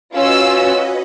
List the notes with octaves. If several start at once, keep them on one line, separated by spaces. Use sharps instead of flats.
C#4 F4 F#4 B4 D#5 E6